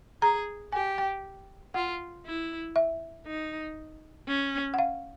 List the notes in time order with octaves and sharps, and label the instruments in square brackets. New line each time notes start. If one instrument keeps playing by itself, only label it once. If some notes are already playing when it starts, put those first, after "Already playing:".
[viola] G#4 [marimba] A#5
[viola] G4 [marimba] G#5
[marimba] G5
[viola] F4 [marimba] F#5
[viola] E4
[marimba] E5
[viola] D#4
C#4
[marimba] F#5
F5